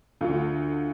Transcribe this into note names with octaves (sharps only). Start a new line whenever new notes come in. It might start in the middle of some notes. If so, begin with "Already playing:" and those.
D2 D3 F4